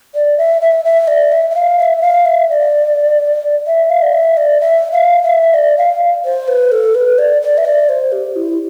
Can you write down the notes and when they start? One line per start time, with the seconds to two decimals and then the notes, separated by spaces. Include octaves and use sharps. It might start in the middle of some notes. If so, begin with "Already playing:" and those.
0.14 D5
0.38 E5
0.62 E5
0.85 E5
1.08 D5
1.32 E5
1.50 E5
1.55 F5
1.79 E5
1.97 E5
2.02 F5
2.25 E5
2.49 D5
3.67 E5
3.90 F5
4.02 D5
4.13 E5
4.37 D5
4.60 E5
4.92 F5
5.23 E5
5.54 D5
5.78 F5
6.25 C5
6.48 B4
6.72 A4
6.95 B4
7.18 D5
7.42 D5
7.58 E5
7.65 D5
7.89 C5
8.12 G4
8.36 E4